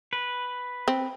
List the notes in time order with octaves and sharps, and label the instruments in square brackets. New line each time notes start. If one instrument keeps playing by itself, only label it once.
[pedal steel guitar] B4
[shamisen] C4